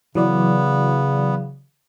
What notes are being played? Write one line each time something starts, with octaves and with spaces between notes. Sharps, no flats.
C#3 E3 F#3 B3 D5